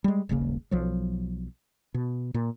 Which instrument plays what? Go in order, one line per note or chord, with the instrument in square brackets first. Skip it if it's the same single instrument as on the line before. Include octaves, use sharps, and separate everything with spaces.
[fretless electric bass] G3 G#3
D#1 G#1 C#3 A#3
B1 F3 F#3
B2
A#2